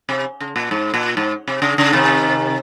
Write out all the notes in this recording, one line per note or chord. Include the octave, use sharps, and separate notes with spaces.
C3
C#3
A#2
G#2
A#2
G#2
C3
C#3
C#3
C3 D#3